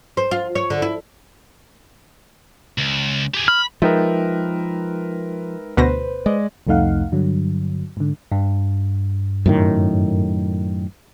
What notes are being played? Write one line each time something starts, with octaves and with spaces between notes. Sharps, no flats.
C5
F4
C#5
D3
E4
C#2
G4 G#4
B5 F6
F3 G#3 D#4 A#4 B4 E5 G5
D2 B2 B4 C5 A#6
G#3 D5 D#5
C2 F2 A3 D#4 F5 F#5
G2 D3 F#3
G#2 D3
G2
F#2 A2 D#3